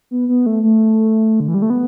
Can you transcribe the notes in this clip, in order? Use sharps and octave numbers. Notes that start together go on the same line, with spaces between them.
B3
B3
A3
A3
D3
E3
G3
A3
B3